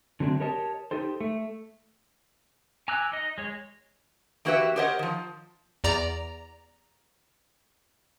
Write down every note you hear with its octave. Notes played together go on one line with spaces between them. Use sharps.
D3 F#3 A3 C4 D4
G4 A#4 C#5 D#5 A5
D#4 G4 A4 C5
A3
G#5 A#5 D6 E6 F#6
D#4 D#5
G#3 C#5
E3 A#3 F#4 G4 B4 E5
G4 A#4 C5 C#5 D#5 F#5
D#3 F3
E2 D5 A#5